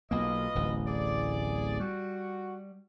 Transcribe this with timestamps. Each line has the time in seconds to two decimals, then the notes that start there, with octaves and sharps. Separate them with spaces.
0.11 B1 A#3 F4 B4 D#5
0.55 D1 A1
0.86 G#4 D5
1.80 G3 F#4